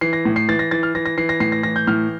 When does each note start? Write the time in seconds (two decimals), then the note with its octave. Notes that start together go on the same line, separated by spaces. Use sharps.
0.01 E3 C7
0.13 A#6
0.25 A2
0.36 C7
0.49 E3 A6
0.59 A#6
0.71 E3 A6
0.83 F6
0.95 E3 A#6
1.06 A#6
1.17 E3 C7
1.29 A#6
1.40 A2 C7
1.52 A#6
1.63 E3 A#6
1.76 G6
1.87 A2 F6